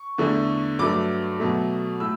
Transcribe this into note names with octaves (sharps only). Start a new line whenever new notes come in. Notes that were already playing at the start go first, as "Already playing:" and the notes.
Already playing: C#6
E2 D3 A3
G2 F#3 A3 D6
B2 F#3 A3
A2 E6